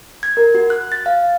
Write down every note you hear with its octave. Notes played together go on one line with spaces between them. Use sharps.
G#6
A#4
F#4
F#6
A6
F5